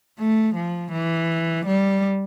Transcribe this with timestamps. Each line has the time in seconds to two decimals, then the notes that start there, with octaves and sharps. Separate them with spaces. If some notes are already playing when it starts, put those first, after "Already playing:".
0.19 A3
0.55 F3
0.92 E3
1.66 G3